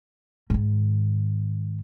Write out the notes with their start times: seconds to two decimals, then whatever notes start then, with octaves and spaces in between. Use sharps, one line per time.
0.50 G#2 D#3